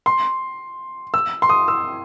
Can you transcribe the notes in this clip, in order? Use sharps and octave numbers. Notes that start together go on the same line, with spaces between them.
C6
E6
C6
D#6
E6